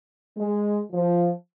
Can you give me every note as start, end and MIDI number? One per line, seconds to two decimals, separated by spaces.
0.37 0.80 56
0.93 1.31 53